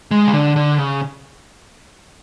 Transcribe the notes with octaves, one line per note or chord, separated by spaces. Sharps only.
G#3
C#3
D3
D3
C#3